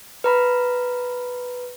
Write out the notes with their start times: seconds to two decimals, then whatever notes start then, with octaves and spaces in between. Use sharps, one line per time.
0.24 B4 A#5 B5